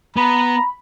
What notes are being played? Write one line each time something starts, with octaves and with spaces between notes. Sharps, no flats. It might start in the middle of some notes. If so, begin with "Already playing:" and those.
B3 A#5 B5